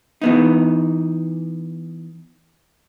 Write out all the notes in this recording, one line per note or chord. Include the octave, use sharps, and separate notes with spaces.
E3 B3 D#4